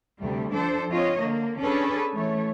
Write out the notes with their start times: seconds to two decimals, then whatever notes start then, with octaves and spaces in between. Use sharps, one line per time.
0.21 D2 C3 G3 A3
0.52 F3 D4 A4 C5
0.90 C4 F4 C#5 D#5
1.21 D3 A#3
1.61 C#4 D4 G#4 A4 B4
2.15 E3 A3 C#5